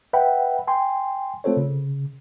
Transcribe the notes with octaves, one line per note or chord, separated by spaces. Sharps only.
B4 E5 F#5 G5 B5
G5 G#5 C6
A3 C4 F4 A4 C5 C#5
C#3